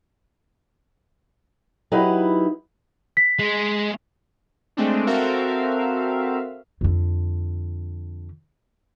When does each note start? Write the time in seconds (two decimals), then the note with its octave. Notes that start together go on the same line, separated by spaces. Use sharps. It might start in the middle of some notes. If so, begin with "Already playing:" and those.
1.92 F#3 D#4 E4 G4 B4
3.17 B6
3.39 G#3
4.77 G#3 A3 C4 D4
5.07 C4 F#4 A4 A#4 E5 F5
6.81 F2 D3